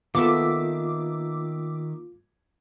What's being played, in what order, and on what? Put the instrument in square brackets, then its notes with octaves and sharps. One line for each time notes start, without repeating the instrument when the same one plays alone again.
[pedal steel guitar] D#3 E5 [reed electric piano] A#3 F4 [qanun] B3 A4 [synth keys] D6